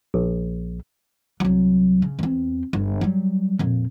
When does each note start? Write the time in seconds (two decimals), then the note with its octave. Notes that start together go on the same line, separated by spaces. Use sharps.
0.14 A#1
1.40 C2 F#3
2.02 C#3
2.19 E2 C4
2.73 G1
3.01 F#3 G3
3.59 F2 A#2